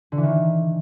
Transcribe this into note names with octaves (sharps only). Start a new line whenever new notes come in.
D3
E3
D#3